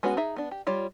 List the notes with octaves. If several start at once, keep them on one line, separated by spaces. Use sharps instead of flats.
G#3 B3 C#4 F#4 B4
D#4 G#4 E5
B3 D4
G4
G3 F4 C#5